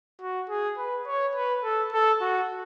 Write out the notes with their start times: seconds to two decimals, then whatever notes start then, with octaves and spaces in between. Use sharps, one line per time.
0.21 F#4
0.50 G#4
0.78 B4
1.06 C#5
1.35 B4
1.64 A4
1.92 A4
2.21 F#4